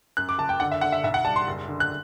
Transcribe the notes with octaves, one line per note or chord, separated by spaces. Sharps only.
F#2 F#6
D6
F#1 A5
G5
D3 F#5
E5
D3 F#5
E5
B1 E5
F#5
G3 A5
C6
F#1
D3
F#6